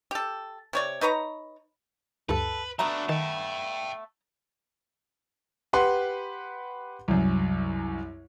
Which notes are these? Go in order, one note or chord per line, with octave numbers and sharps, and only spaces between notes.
G4 A4
C3 C#5 D5
D#4 B4 C#5 A#5
D2 G2 A4 B4
F#3 A3 B3 D4 A#5
D#3 G5 A5
G4 B4 F#5 C6
C2 F#2